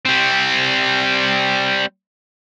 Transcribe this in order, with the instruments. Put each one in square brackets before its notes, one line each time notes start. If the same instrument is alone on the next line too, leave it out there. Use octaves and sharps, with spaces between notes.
[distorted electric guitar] G3 C4